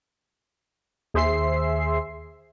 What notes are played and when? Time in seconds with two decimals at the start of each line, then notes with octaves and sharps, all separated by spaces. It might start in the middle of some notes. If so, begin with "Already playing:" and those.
1.14 D#2 G#4 C5 E5 C6 C7